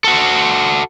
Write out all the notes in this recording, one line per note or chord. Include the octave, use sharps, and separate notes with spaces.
F#4 A4